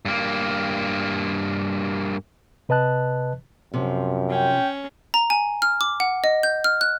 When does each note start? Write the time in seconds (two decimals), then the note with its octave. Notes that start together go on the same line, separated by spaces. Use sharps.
0.05 G2 A#3
2.69 C3 B4 D#5 A5 F#6
3.74 F#2 C3 F3
4.30 C#4 G5
5.14 A#5
5.30 G#5
5.62 F6
5.81 D6
6.00 F#5
6.24 D#5
6.43 G6
6.64 F6
6.81 F#6